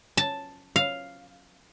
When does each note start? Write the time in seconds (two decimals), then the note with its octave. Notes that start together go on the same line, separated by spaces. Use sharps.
0.17 A5
0.76 F5